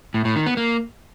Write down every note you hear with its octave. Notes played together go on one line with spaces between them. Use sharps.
A2
A2
D#3
B3
A#3